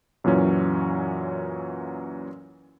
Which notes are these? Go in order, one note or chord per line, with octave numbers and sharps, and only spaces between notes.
F#2 A#2 E3 F#3 C#4